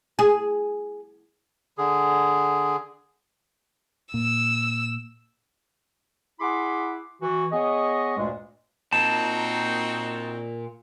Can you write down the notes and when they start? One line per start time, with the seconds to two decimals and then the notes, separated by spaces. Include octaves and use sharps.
0.19 G#4
1.78 D3 G#4
4.14 A#2 E6
6.40 E4 G#4 F#5 B5 C6 D6
7.21 E3 F#4
7.52 B3 G#4 C#5 D#5
8.17 D2 G2 A#2 G#3
8.93 A#2 C4 D#4 F#4 A5